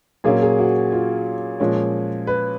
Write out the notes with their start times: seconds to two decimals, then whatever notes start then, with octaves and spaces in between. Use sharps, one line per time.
0.24 A#2 F#3 A#3 C#4 G#4
0.42 G#4
0.59 F#4
0.92 F4
1.60 A#2 F3 G#3 C#4
2.27 B4